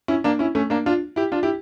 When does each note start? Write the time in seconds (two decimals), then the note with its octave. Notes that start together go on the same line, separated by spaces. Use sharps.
0.08 C#4 E4
0.24 A#3 D4
0.39 C#4 E4
0.55 A3 C#4
0.70 A#3 D4
0.86 D4 F4
1.16 E4 G4
1.32 D4 F4
1.43 E4 G4